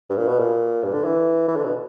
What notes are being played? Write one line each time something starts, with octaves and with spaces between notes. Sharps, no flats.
G2
A#2
B2
A#2
G2
D3
E3
E3
D3
B2